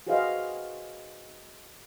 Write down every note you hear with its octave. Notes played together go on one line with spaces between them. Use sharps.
F#4 G#4 B4 C5 D#5 F5